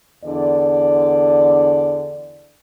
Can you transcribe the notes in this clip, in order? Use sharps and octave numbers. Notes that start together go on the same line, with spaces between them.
E2 D3 D5